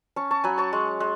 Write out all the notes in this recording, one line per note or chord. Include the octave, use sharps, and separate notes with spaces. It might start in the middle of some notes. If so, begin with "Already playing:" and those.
C#4 A5 C#6
A5 C#6
F#3 G#5 B5
A5 C#6
G#3
G#3